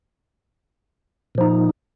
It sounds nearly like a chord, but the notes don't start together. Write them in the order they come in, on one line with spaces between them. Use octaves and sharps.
A#2 F3 D#4